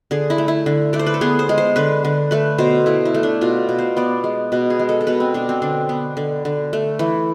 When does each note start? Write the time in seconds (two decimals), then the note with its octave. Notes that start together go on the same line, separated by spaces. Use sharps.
0.11 D3 G#4
0.30 E4
0.38 A3
0.48 E4
0.66 D3
0.93 A3 D5
0.99 C5
1.06 B4
1.14 A4
1.21 B3 G#4
1.39 C5
1.49 G#3
1.58 C5
1.76 D3 B4
2.04 D3
2.31 A3 B4
2.58 B2 C5
2.86 A3 E4
3.05 E4
3.14 A3
3.23 D4
3.41 B2 F4
3.69 B2
3.79 C5
3.97 B3 D5
4.24 G#3
4.52 B2 B4
4.70 G#4
4.79 G#3
4.89 A4
5.01 A4
5.07 B2 B4
5.20 C4
5.34 B2 D4
5.49 C4
5.62 D3 D4
5.89 B3
6.17 D3
6.45 D3
6.73 A3
6.99 E3